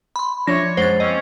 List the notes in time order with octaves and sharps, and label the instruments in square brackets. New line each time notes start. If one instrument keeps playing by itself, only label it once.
[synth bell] B5 C6
[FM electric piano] F3 [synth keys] D4 E5 [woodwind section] C#5 [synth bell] A#6
[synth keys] F#2 G#3 F#5 [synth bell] C5 A6
[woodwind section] A#3 C4 C#4 [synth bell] D#5